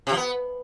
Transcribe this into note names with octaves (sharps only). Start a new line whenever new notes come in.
C3
F3
B3